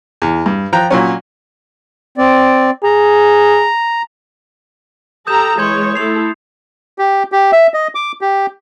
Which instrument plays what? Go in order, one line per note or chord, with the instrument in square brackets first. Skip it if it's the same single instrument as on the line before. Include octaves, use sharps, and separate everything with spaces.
[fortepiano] E2
G2
F3 G5 A#5 F#6
A#2 F#3 C#4
[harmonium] C4 D5
[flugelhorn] G#4 [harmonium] A#5
[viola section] G4 A4 A#5 [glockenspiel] D#6 G6 E7
[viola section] E3 G#3 C#5 [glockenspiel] C6 G6 G#6
[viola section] A3 E4 A4 [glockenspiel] C7 F7
[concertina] G4
G4
E5
D#5
D6
G4